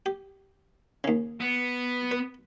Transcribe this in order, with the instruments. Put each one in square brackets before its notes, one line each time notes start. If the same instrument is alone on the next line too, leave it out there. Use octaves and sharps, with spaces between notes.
[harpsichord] G4
D#2 C#3
[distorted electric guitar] B3
[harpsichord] B4